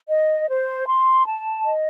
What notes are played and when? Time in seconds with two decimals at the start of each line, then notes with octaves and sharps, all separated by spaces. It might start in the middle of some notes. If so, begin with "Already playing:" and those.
0.10 D#5
0.49 C5
0.88 C6
1.26 A5
1.65 D#5